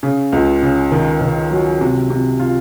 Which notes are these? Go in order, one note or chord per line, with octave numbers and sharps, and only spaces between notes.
C#3
C#2
C#3
D#3
D#3
F#3
C3
C3
F4